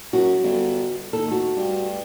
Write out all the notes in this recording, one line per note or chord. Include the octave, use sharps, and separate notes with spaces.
F#2 F#4
G1
D#2 A4
A3 F#4
G2